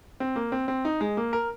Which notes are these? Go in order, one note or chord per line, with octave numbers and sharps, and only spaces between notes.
C4
A#3
C4
C4
D#4
G#3
A#3
A#4